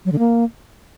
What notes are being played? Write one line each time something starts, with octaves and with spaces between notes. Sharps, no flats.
F#3
D3
A#3